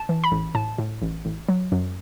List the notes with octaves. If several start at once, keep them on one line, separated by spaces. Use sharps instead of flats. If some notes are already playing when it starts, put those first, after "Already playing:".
Already playing: A5
E3
B5
A1
A2 A5
A2
A1
A1
F#3
F#2